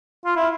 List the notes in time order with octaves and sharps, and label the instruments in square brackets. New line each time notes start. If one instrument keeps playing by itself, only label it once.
[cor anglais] F4
E4